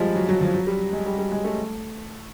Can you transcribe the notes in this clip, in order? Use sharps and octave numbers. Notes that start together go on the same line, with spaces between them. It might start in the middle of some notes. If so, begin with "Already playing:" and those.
Already playing: F3 G3 G#3
F#3
F#3
F3
F#3
G3
G#3
G3
G3
G#3
A3